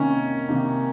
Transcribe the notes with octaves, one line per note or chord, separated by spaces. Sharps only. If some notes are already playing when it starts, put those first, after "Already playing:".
Already playing: C3 D#3 A#3 C#4 D#4
C3 D#3 A#3 D#4